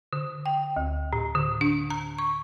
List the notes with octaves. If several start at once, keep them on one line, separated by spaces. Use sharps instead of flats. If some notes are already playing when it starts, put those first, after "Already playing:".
D3
G5
D2
A2
D3
D4
A#5
C#6